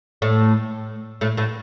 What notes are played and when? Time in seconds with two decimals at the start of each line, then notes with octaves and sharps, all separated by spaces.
0.22 A2 A3
1.21 A2 A3
1.37 A2 A3